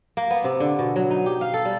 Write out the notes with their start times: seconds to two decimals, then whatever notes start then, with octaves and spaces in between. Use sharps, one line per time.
0.17 A#3
0.30 B3
0.44 C3
0.60 D3
0.79 B2
0.96 F#3
1.11 D#4
1.26 G4
1.41 F5
1.54 A4
1.65 G3